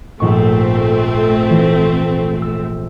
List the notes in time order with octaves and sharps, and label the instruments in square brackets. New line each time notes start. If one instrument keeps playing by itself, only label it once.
[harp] A#1 G#2 C#6 [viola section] A3 C4
[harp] E3 A#6
E6